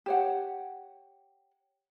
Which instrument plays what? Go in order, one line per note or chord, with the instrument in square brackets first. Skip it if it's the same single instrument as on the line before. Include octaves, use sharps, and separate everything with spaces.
[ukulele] G4 C#5 F#5